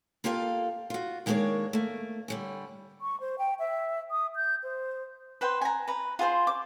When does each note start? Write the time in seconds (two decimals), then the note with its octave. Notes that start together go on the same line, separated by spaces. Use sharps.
0.24 A#3 F4 G4 A4 F5
0.90 F4 F#4
1.26 D#3 G#3 A#3 D4 G#4 C#5
1.73 A3 A#3
2.28 D3 G3 C#4
3.01 C#6
3.20 C5
3.38 G5
3.59 E5
4.11 D#6
4.36 G6
4.63 C5
5.41 B4 C5 G5
5.61 G#5 A#5
5.87 B4 A#5
6.19 F4 G#4 C5 C6
6.47 D6